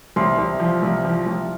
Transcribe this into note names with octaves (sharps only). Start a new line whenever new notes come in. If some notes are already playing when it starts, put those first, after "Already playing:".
C2 C6
C2
F3
C2
F3
C2